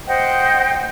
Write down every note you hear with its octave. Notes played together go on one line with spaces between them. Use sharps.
C5 D#5 F#5 G5